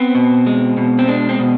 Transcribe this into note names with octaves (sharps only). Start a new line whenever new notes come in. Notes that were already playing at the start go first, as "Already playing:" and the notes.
Already playing: B3 C4
B2
G#3
B2
C4
G#3 D4
C4
B2